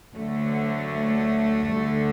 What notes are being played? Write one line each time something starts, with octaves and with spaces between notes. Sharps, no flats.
D2 D3 F#3 A3
D2 D3 G3